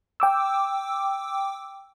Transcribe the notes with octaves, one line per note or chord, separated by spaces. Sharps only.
G5 D6 E6